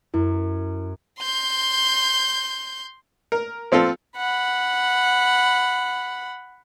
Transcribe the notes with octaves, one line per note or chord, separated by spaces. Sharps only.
F#2 E4
C6 G6
A#4
F3 C4 F4 A4
F#5 B5